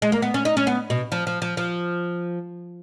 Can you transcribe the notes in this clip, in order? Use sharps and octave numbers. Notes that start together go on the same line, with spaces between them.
G#3
A#3
B3
C#4
D#4
C#4
B3
B2
F3
F3
F3
F3